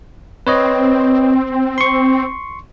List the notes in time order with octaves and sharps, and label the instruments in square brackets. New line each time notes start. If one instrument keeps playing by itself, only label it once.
[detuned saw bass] C4 [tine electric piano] B4 C#5 D#5
[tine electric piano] C6 C#6